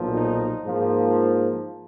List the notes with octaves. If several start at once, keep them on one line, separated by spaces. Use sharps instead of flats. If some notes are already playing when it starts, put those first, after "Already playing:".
Already playing: B1 A#2 F3
D#4
G#2 F3 A#3